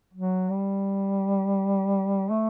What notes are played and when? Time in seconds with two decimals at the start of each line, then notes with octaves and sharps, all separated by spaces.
0.14 F#3
0.50 G3
2.30 A3